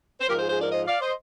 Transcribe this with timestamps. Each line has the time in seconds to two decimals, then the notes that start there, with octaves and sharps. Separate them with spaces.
0.21 C5
0.28 G#2 F3 G4 A#4
0.39 G#4 C5
0.49 G#4 C5
0.61 A#4 D5
0.72 C5 D#5
0.87 D5 F5
1.01 C5 D#5